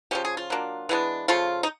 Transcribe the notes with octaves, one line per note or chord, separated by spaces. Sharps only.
C#3 F3 G#3 C#4 G4
G#4
F4
F#3 A#3 D4
E3 G#3 B3 D4
C#3 F3 A3 F4
D#4